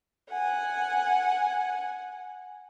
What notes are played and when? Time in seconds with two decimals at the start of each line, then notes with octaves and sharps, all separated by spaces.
0.30 F#5 G#5